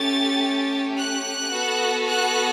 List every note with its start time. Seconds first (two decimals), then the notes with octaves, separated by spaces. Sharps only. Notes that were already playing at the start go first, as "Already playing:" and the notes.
Already playing: A3 C#4 G4 A6
0.97 F#6
1.52 B3 F#4 A4
2.07 F#6